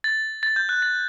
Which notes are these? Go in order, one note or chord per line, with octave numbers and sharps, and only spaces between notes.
A6
A6
G6
F#6
A6